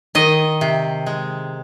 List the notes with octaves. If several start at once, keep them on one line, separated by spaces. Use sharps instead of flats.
D#3 D#5
C3
G#3